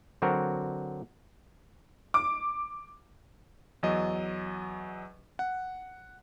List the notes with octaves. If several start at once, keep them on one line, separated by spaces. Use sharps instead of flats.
D3 F#3 C4 F#4 A#4
D6
E2 F#3 D#5
F#5